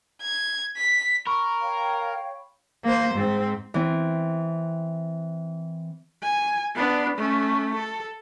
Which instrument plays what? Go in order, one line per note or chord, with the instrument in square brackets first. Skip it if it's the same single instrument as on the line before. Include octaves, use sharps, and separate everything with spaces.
[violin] G#6
B6
[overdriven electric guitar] A#4 [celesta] B5 C#6
[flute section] C#5 F5 G5
[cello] A#3 C5
G#2 C4
[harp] E3 C4
[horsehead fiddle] G#5
B3 D4
A3 C#4
A4